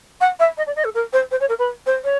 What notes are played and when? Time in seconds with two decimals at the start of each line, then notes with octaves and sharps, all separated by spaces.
0.21 F#5
0.40 E5
0.58 D#5
0.67 D5
0.76 D#5
0.85 A4
0.95 A#4
1.13 C5
1.31 C5
1.40 C#5
1.49 A#4
1.59 B4
1.86 C5
2.04 C#5